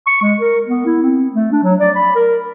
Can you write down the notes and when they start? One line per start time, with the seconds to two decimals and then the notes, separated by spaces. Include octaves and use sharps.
0.07 C#6
0.22 G#3
0.40 A#4
0.66 B3
0.86 E4
1.02 C4
1.34 A3
1.52 D4
1.63 F#3
1.80 D5
1.96 B5
2.15 A#4